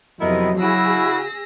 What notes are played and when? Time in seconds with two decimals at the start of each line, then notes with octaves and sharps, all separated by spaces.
0.21 F2 C3 F#3 B3 E4 A#4 D#5
0.60 C#3 E4 F#4 G#4 E6 A#6